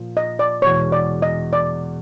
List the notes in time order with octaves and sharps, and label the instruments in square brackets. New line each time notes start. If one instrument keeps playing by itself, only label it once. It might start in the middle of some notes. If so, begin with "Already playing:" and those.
Already playing: [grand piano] A#2 F3
[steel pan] D#5
D5
[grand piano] E2 B2 G#3 [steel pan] C#5
[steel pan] D5
D#5
D5